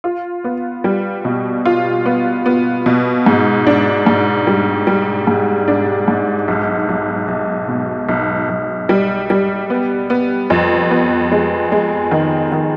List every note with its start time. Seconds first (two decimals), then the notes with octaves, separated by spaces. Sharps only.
0.04 F4
0.44 B3
0.84 G3
1.25 B2
1.65 F4
2.06 B3
2.46 B3
2.86 B2
3.26 G#2
3.67 D4
4.07 G#2
4.47 G3
4.87 G3
5.27 G#2
5.68 D4
6.08 G#2
6.48 B1
6.89 B1
7.28 B1
7.69 B2
8.09 B1
8.49 B1
8.89 G3
9.30 G3
9.70 B3
10.10 B3
10.50 F2
10.91 B3
11.32 G#3
11.72 G#3
12.11 D#3
12.52 D#3